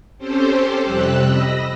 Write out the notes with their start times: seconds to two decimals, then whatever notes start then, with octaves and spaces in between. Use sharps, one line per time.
0.18 C4 C#4 G4 A4 C5
0.84 F2 C3 G3 G4 E6 F#6
1.24 D#5 B5 E6 A#6